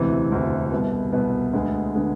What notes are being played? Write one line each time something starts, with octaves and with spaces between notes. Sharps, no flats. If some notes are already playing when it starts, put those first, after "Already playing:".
Already playing: E1 D2 C3 E3
E1 D2 C3 E3
C2 B2 B3
C2 B2 B3
D2 D3 G#3 B3
D3 G#3 B3